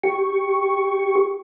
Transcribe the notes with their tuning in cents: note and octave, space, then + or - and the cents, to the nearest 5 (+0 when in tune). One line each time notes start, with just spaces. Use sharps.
G4 +0 C#6 +0